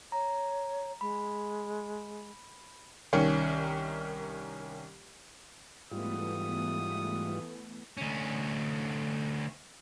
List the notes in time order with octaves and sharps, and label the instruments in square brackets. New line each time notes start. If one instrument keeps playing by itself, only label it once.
[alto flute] C#5 [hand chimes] A#5
[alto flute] G#3 [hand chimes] B5
[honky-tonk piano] C2 D#3 C#4 C#7
[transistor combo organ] G#2 G3 F4 [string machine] E3 A3 B3 [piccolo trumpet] D#6
[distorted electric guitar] D2 C#4